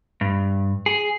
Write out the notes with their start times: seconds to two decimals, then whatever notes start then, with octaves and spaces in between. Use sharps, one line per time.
0.21 G2
0.86 G#4